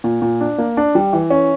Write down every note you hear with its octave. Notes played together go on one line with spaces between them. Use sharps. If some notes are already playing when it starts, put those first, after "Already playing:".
A#2
A#2
D4
A#3
D4
G3
E3
C#4